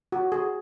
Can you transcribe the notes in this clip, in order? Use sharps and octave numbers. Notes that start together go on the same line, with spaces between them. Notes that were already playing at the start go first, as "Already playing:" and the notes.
F#4
G#4